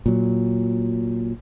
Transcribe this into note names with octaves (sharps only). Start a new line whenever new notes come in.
A#2 F#3